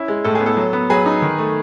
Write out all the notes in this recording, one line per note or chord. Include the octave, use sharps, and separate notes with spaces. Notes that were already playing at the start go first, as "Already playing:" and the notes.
Already playing: C#4 E4
G#3
A2 A4
G#4
B3
A4
F#3
B3
F#3 G#4 B4
D#4
D#3
A3